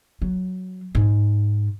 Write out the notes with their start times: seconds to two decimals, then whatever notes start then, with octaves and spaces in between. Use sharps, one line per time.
0.22 F#3
0.95 G#2